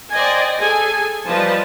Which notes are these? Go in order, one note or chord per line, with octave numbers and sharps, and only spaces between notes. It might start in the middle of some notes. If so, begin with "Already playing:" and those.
C5 D5 D#5 G5 G#5
G#4 A4 G#5
F3 G3 B4 D#5 A5